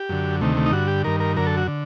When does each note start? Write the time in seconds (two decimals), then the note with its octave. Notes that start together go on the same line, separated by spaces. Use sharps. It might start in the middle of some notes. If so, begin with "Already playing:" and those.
Already playing: G4
0.09 F#2 D3
0.41 D2 C3 D#3 A3
0.57 A3
0.66 D#4
0.72 G2 D3 F#4
0.88 G4
1.04 G2 D#3 A#4
1.20 A#4
1.36 F#2 D3 A#4
1.47 A4
1.57 F#4
1.67 D3